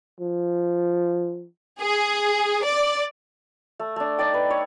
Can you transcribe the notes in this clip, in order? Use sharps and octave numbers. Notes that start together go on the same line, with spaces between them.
F3
G#4
D5
A3
A3 D4
D4 D#4 D5 G5
B4
C#5